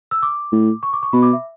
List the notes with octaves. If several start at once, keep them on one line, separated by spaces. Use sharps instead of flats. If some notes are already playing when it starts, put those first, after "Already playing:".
E6
D6
A2
C#6
D6
C#6
B2 B5
D6
E5